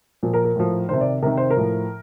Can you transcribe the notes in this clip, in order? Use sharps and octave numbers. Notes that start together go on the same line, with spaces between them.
A#2 F3
A#4
A#4
A2 F3
C3 D#3 C5
D5
C3 D#3 A#4
C5
A#4
A2 F3